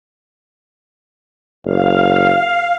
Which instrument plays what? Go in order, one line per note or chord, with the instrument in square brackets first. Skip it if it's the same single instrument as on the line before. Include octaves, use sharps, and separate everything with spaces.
[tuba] F#1 [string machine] F5